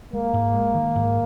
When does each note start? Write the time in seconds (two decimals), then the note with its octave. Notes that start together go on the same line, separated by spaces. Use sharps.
0.13 G#3 A#3
0.33 G#2
0.54 G#3
0.75 D#3
0.95 G#2